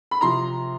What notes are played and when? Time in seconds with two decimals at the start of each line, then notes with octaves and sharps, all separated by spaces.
0.11 B5
0.21 C3 F3 A#5 C6